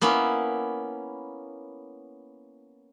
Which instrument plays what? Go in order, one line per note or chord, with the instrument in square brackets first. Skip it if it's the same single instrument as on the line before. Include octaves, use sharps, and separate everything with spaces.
[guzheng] A#3 B3 C#4 E4